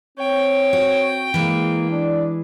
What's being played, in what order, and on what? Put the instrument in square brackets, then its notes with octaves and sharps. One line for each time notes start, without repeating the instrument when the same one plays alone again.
[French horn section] C4 [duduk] C#5 [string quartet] G5
[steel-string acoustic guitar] F#4
[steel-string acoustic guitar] E3 G#3 [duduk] A#3
[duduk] D4 [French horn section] D5